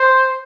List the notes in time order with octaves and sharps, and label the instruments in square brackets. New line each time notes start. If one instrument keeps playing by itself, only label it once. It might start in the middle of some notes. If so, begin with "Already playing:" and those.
Already playing: [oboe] C5